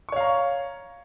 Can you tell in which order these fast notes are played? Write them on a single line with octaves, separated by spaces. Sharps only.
C#6 C#5 F5 A#5